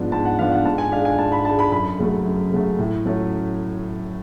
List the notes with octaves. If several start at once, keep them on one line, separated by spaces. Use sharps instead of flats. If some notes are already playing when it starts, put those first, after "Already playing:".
Already playing: G#2 F3 B3 D4
G#2 A5
F#5
F3 B3 D4 F5
F#5
G#2 A5
G#5
G#3 D4 F5
G#5
G#2 A5
B5
G#3 D4 A5
B5
F#2 B5
C#3 F#3 A3
F#2
C#3 F#3 A3
A2
F#3 A3 C#4